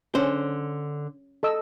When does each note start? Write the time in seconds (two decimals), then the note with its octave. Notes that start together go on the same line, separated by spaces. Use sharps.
0.15 D3 C#4 C5
1.43 A4 D#5 E6